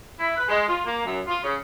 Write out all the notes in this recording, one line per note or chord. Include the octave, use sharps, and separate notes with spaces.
E4
B4
G#3
F4
A#3
F#2
F4
C#3